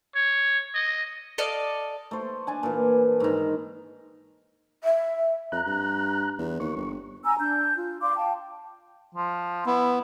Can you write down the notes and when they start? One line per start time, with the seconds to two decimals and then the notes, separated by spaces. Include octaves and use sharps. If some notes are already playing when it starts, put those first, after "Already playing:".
0.15 C#5
0.75 D#5
1.38 A4 D5 D#5 F5
2.11 A3 C5
2.47 D4 G#5 A5
2.63 A#2 E3
3.20 G#2 D#3
4.84 E5
5.52 F2 A#5 F#6
5.66 G2
6.39 E2
6.60 D#2 C#6
6.76 G1
7.25 G#5 A#5 E6
7.39 D4 G6
7.76 F4
8.01 D5 F5 C6 D6
8.16 F5 G5 A5
9.15 F3
9.66 B3 E4